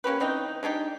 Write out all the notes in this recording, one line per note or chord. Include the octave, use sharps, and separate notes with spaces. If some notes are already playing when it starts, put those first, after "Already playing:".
A#3 C#4 G4 B4
E3 C4 D#4 G5
G#3 D4 D#4 G4